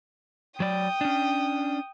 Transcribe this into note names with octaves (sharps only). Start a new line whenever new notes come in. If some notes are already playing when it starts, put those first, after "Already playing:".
F#3 D5 G5 D#6
C#4 D4